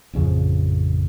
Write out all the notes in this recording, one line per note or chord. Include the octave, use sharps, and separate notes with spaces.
A1 F2 C#3 F3